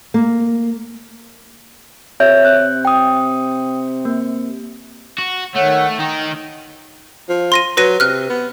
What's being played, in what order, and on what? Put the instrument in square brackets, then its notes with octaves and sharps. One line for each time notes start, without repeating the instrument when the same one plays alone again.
[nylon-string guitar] A#3
[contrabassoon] C3 [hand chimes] C#5 E5 G6
[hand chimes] F#6
G5 D#6
A#3
[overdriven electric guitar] F#4
[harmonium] D#3 C#5 F#5 [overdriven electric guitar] A3
[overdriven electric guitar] D#3 D#4 [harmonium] G5
[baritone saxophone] F3
[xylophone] C6 A#6 D#7
[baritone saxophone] F#3 [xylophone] B4 A#6 D#7
[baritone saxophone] C3 [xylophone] F6 F#6
[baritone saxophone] B3